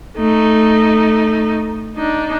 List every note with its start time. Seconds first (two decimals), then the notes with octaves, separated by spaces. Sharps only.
0.17 A3 D#4
1.96 D4 D#4